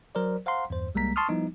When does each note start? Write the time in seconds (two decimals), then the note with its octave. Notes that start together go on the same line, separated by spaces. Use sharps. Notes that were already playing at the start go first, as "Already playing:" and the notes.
0.15 F#3 A#4 C5 D5
0.46 C5 F5 F#5 A#5 C6
0.70 E2 G2 C5
0.95 C2 G3 G#3 A#3 A#5 B6
1.16 A5 C6 C#6 D#6 F6
1.29 F3 G3 B3 D#4 E4